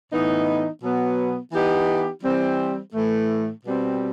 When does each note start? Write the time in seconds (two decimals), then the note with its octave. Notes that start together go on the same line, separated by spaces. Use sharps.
0.11 A2 E3 B3 D#4
0.82 B2 F#3 B3
1.53 E3 B3 D#4 G4
2.23 E3 G3 C4
2.94 A2 E3 A3
3.65 B2 G3 C4